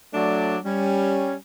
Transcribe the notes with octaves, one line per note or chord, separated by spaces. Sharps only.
F#3 A3 D4 C#5 D5
G3 C#4